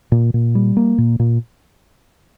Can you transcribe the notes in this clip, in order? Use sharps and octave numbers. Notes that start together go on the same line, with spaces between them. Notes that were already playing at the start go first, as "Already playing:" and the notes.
A#2
A#2
G3
A#3
A#2
A#2